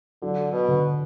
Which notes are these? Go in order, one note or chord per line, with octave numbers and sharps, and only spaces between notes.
D3 F#3
B2
D3